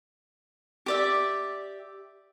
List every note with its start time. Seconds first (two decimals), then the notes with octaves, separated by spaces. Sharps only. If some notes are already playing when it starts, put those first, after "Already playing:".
0.86 G4 D5 E5